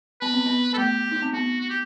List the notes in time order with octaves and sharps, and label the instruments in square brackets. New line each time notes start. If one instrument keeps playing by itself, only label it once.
[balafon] B3 [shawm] B4
[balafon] C4
B3
[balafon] B3 [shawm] A4
[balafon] A3 [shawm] G4
[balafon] D#4
C4
[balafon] B3 [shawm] F#4
[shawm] F#4
G4